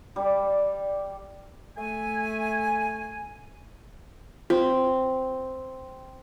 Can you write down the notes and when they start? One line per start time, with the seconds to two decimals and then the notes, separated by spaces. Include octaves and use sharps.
0.16 G3 D5
1.78 A3 G#5
4.50 C4 F4